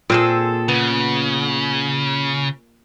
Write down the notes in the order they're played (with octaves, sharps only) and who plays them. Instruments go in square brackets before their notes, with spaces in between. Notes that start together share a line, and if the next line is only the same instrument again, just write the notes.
[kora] A#2 [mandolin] C4 G#4 A4
[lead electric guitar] C#3 [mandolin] B3